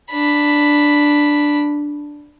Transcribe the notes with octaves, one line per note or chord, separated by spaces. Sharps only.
D4 B5